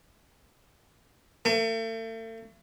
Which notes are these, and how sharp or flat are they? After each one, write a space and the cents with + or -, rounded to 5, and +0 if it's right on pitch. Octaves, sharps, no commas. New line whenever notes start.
A3 +40